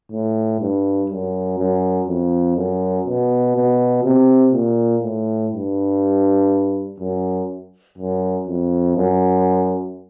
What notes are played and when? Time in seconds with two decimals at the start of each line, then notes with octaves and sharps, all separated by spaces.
0.12 A2
0.61 G2
1.10 F#2
1.59 F#2
2.09 F2
2.57 F#2
3.07 B2
3.56 B2
4.04 C3
4.53 A#2
5.03 A2
5.53 G2
7.00 F#2
7.98 F#2
8.47 F2
8.96 F#2